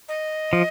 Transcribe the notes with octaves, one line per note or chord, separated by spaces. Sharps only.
D#5
F3